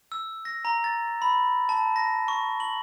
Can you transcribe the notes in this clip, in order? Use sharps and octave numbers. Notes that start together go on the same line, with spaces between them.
E6
A#6
A#5
A6
B5
A5
A#6
C#6
F#7